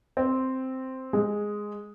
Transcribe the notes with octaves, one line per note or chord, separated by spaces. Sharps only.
C4
G#3